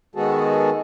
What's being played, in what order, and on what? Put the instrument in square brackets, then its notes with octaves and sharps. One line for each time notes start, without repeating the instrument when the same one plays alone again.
[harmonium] D#3 G#3 B3 F#4 G#4 A4